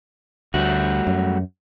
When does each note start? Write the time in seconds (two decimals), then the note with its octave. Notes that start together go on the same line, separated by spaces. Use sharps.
0.54 D2 G3 A3 F#4
1.07 F#2